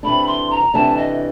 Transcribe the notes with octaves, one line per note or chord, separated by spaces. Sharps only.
C3 E3 A3 D4 B5
C6
A#5
C3 E3 A3 D4 A5
D#5